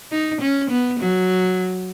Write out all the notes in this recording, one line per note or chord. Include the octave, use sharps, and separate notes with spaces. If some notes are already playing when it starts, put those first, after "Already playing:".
D#4
C#4
B3
F#3